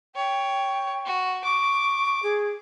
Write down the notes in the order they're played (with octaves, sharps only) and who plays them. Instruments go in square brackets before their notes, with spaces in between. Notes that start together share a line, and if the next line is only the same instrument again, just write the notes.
[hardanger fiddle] C#5 [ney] G5
[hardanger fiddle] F#4
[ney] C#6 [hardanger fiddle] D6
[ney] G#4